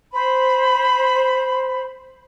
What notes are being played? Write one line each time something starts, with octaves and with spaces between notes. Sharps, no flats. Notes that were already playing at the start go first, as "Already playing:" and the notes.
C5 B5